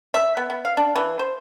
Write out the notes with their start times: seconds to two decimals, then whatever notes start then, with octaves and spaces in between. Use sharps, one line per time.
0.14 E5
0.37 B3
0.50 B3
0.65 F5
0.77 D4
0.96 E3
1.19 C5